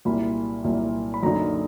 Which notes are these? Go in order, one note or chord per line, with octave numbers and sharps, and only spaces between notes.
C2 A#2 F#3 A#3 B5
C2 A#2 F#3 A#3
B5
F#2 D3 F#3 A#3 D#4 A#5